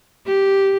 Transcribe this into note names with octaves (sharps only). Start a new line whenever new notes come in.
G4